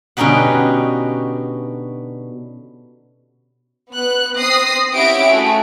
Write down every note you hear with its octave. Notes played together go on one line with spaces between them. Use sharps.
B2 D3 C#4 D#4 G4 F#5
B3 F#6
C4 D#6 A#6 C7
C#4 E4 G4 E5 F#5 D7
A3 F#4 G#4